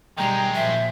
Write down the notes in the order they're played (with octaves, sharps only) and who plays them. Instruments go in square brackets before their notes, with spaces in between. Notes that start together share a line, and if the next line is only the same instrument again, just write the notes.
[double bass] B2 G3 [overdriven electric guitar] D#3 G#3 [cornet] G5 [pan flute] A#5
[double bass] A#2 F3 [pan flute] E5